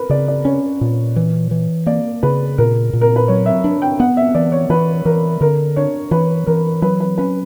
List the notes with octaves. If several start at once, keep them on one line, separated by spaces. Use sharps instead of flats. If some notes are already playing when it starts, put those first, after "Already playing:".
Already playing: A#4 B4
C#3 D5
D5
C#4 C#5
A#2
E3
E3
A#3 D5
C#3 B4
A#2 A#4
A#2
A#4
B4
F#3 C#5
E5
D4
G5
B3 F#5
E5
E3 D5
C#5
E3 B4
E3 A#4
D3 A#4
D4 C#5
E3 B4
E3 A#4
F#3 B4
B4
C#4 B4